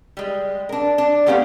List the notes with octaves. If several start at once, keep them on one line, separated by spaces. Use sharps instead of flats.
G3 G#3
D4 A#4
D4
A3 B3 C#4 G4 C#5 F5